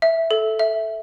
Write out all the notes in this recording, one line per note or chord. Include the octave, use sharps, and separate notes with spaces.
E5
A4
E5